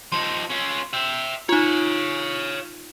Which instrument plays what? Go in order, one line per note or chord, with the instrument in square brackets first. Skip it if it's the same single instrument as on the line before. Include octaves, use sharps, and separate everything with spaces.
[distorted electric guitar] F3 D#4 [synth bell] C6
[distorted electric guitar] C#4 F4
E5 G5
[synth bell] D#4 F4 [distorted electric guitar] C#5 F5